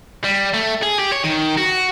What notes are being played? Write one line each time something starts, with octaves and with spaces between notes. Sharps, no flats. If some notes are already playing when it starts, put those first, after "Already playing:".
G3
A3
G#4
G4
C#5
D#3
F#4